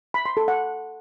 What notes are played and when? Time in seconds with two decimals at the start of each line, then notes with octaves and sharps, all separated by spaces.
0.14 B5
0.26 C6
0.37 A4
0.48 F#5